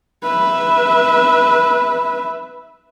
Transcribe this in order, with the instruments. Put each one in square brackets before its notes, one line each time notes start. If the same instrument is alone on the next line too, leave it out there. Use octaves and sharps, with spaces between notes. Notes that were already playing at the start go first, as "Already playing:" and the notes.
[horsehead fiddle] B4 E5